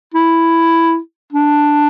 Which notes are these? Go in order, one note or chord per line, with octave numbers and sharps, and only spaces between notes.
E4
D4